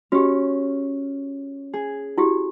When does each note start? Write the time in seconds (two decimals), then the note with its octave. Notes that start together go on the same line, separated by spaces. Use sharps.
0.12 C#4 F#4 G4
1.73 G#4
2.18 E4 F#4 G4